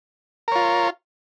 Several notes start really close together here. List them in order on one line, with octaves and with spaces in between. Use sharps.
A#4 C#5 F4